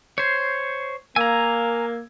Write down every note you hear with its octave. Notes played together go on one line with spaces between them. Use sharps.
C5 C#5 G6 G#6 C7
A#3 G#5 A#5 E6 G#6